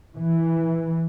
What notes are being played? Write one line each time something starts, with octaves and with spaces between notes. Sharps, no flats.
E3